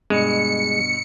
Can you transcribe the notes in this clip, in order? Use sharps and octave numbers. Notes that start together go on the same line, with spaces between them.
G2 B2 G#3 C#7